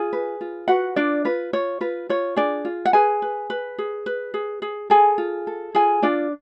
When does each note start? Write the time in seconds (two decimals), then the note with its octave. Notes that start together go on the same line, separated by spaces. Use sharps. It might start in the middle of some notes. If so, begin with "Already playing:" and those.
Already playing: F4 G#4 G#5
0.13 B4
0.41 F4
0.68 F#4 B4 F#5
0.96 D4 F4 D5
1.25 F4 B4
1.53 F4 C#5
1.81 F4 B4
2.09 F4 C#5
2.36 D4 G#4 D5
2.65 F4
2.85 F#5
2.93 G#4 B4 G#5
3.22 B4
3.50 B4
3.78 G#4
4.06 B4
4.34 G#4
4.62 G#4
4.90 G#4 A4 G#5
5.18 F4
5.47 A4
5.75 F4 G#4 G#5
6.02 D4 F4 D5